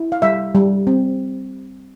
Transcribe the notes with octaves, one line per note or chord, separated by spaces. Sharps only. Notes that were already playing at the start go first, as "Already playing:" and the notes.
Already playing: E4
F5
G3 E5
G3
C4